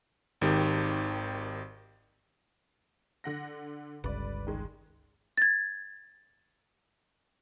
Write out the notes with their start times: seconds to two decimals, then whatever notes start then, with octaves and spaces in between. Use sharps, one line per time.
0.41 G#1 D#3 G4
3.24 D3 F#5 A#6
4.04 G1 C#2 B4 D5
4.47 D#3 G#3
5.37 G#6 A6